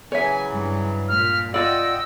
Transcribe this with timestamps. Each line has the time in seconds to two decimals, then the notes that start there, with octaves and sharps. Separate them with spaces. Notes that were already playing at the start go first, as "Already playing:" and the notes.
0.12 C#3 E3 F#3 C#5 E5 G#5
0.51 G2
1.08 A#2 F6
1.54 F4 D5 D#5 F#5 G5 E6